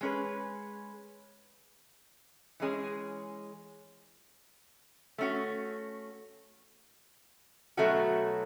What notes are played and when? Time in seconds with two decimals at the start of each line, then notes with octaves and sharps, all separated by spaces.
0.01 G#3 C#4 G#4 B4
2.60 E3 G#3 C#4 G#4
5.18 A3 C#4 F#4
7.77 B2 F#3 A3 C#4 F#4